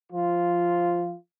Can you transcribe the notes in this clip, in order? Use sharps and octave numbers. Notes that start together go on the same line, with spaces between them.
F3 F4